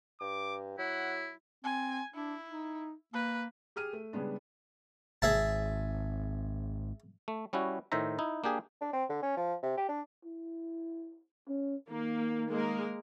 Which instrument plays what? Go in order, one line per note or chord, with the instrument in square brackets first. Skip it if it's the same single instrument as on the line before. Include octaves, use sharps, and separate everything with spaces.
[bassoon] G2 [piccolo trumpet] D6
[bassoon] F#3 [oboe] E4 [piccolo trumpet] F#5
[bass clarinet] C4 [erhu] G#5
[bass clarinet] D4 [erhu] E4
[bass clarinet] D#4
[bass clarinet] A#3 [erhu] B4
[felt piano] G4 G#4 F6 D#7
A3
C#3 G3 G#3 B3 D4
[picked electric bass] G#1 [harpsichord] G#4 E5 A5
[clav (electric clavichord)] A3
G3 C#4 E4 F#4
A2 D#3 C5 E5 A#5
D#4 E4
A#3 D4 G4 G#4
[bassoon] D4
C4
D3
C#4
F3
C3
G4
D4
[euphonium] E4
C#4
[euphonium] D#3 [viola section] A#3
[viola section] G#3 A#3 A#4